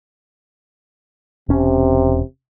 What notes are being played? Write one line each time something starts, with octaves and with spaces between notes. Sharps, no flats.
E1 C3 C#4